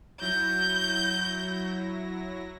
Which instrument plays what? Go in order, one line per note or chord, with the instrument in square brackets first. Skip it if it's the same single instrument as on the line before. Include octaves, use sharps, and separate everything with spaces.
[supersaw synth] F#3 E4 A#6 [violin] G6